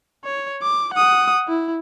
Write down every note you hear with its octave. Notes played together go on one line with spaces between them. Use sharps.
C#5
D6
F#5 D#6
E4